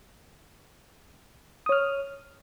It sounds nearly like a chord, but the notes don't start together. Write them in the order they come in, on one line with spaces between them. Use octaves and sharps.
D#6 C#5 F6